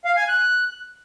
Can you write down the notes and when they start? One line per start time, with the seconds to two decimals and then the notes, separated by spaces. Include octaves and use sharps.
0.05 F5
0.17 G#5
0.28 F#6